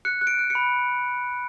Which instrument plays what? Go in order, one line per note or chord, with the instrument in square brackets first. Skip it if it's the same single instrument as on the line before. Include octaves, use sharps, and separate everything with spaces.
[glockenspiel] F#6 C#7
F#6
D7
F#6
C#7
B5